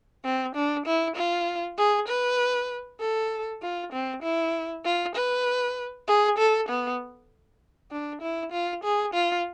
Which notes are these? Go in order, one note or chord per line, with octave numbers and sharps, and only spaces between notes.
C4
D4
E4
F4
G#4
B4
A4
F4
C4
E4
F4
B4
G#4
A4
B3
D4
E4
F4
G#4
F4